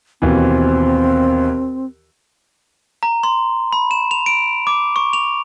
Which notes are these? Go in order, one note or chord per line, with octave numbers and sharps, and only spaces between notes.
D#2 B2 E3 C4
A#5
C6
B5
E7
F7
D7
D6
C#6
F7